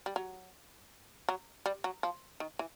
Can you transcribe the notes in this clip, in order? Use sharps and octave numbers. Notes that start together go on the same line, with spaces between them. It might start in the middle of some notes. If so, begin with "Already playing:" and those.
G3
F#3
F#3
G3
F#3
F3
D#3
E3